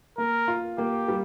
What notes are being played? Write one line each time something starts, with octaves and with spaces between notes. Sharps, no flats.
A#3 A#4
F4
A#3 G4
G3